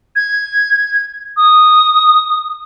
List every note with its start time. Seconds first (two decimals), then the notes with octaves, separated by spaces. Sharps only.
0.16 G#6
1.37 D#6